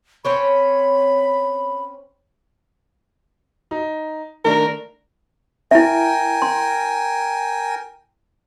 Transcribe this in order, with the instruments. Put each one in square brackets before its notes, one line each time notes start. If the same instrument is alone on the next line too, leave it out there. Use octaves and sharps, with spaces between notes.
[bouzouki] C4 C#4 C#5 [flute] B5
[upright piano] D#4
[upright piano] D#3 A3 D4 [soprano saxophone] A#4
[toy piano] E4 E5 [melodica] A#4 G5 G#5
[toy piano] C6